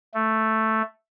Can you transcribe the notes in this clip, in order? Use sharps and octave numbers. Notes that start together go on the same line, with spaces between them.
A3